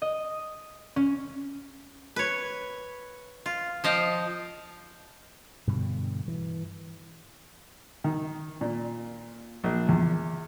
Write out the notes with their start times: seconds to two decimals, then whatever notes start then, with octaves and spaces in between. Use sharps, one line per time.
0.02 D#5
0.96 C#4
2.16 B4 C#5
3.46 F4
3.84 F3 D#5 F5 G5
5.67 G2 B2 D3
6.28 E3
8.04 D#3
8.61 A#2
9.64 A#1
9.89 E2